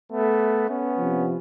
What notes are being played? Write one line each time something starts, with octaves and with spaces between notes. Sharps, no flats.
A3 B3
B3 C#4
C3 F3